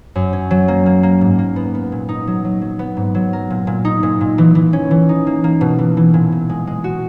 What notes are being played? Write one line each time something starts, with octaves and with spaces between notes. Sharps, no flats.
F#2
C#4
F#3
A#3
A#3
A#3
G#2
A#3
B3
B3
A#2
D#4
F#3
F#3
F#3
B3
G#2
F#3
A#4
A#2
A#2
D#4
A#2
A#2
E3
E3
C#4
E3
D#4
A#3
A#3
B2
E3
E3
A#2
A#2
G#3
G#3
F#4